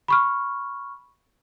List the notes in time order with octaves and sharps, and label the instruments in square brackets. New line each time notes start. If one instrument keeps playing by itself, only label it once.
[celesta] B5 C#6 F6